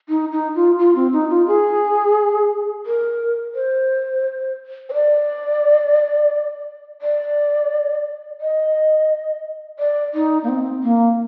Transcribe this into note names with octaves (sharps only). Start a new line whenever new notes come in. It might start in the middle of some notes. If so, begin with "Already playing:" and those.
D#4
D#4
F4
F4
C4
D#4
F4
G#4
A#4
C5
C5
D5
D5
D#5
D5
D#4
A#3
C4
A#3